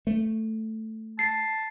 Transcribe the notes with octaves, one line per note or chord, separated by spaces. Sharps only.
A3
A5 C7